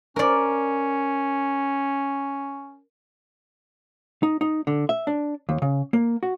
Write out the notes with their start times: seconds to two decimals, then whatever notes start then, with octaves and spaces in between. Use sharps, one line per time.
0.16 C#4 A#4 D5
4.23 D#4
4.41 D#4
4.67 D3
4.89 E5
5.07 D4
5.49 D#2
5.62 C#3
5.93 A#3
6.23 F#4